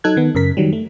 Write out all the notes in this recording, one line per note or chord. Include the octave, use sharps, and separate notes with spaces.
F#3 D#4 A4 F#6 G#6
D#3 B3
F#2 C#3 A#4 B6
D#3 F#3 G3
A3